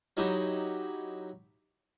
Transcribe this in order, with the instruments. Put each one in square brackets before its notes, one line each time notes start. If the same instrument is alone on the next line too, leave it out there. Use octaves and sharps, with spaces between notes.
[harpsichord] F#3 D#4 E4 G4